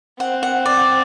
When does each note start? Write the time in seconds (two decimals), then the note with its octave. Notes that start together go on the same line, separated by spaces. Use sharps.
0.20 C4 F#5
0.43 F#5
0.66 D5